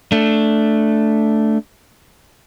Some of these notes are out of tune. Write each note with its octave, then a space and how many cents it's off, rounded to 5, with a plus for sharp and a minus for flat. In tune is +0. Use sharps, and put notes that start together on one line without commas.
A3 +0 D4 +0